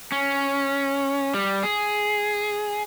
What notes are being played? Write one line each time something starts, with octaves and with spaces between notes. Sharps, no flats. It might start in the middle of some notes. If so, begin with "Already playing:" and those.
C#4
G3
G#4